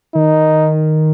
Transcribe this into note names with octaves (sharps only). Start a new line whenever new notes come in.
D#3 D#4